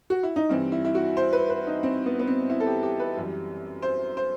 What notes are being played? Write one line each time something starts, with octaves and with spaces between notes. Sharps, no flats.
F#4
E4
D#4
G2 E3 G3 C4
E4
E4
F#4
C5
B4
B4
D#4
C4
B3
B3
C4
E4
A4
G4
G4
B4
F#2 E3 G3
C5
C5